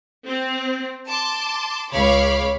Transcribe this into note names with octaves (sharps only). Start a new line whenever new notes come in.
C4
A5 C6 D6
C#2 C#5 F5 B5 D6